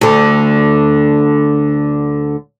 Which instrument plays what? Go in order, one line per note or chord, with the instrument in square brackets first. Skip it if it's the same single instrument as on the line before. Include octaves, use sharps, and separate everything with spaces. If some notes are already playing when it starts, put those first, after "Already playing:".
[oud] D2 D3